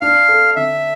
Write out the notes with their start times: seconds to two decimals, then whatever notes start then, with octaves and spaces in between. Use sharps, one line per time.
0.01 D4 F5
0.29 A4
0.56 D3 E5